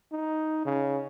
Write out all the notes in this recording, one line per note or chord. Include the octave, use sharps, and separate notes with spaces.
D#4
C#3